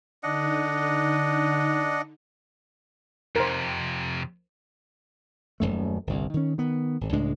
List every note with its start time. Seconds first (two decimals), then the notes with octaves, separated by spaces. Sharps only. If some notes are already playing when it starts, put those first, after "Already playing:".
0.23 D3 D4 D#4 D#5 F#5
3.36 F2 C3 A#4 C5
5.60 D#1 C2 F#2 A3
6.07 G1 C2
6.34 D#3 C#4
6.58 D#3 B3
7.01 G#1
7.13 C#2 A2 G#3 D4